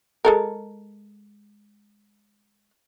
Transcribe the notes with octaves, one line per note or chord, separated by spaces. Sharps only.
G#3 A4 A#4